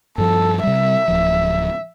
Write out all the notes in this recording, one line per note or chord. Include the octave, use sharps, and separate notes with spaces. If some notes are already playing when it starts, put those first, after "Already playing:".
G2 F3 A4
C3 G3 E5
D1 F3